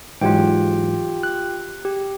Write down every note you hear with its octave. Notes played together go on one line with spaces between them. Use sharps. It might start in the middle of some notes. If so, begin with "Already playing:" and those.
G#2 E3 F#3 F4 G4 G5
F#6
G4